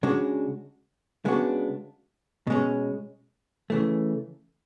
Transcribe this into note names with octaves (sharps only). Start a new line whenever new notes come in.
C#3 G#3 D4 F#4
C#3 G#3 B3 D4 F#4
B2 G#3 C#4
C#3 E3 A3